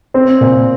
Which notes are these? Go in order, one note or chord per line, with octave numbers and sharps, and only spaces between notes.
C4
A#2